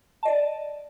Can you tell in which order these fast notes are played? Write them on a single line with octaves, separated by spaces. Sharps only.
A5 D#5 D5